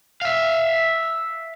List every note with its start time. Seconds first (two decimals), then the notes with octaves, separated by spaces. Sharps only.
0.22 E5 F5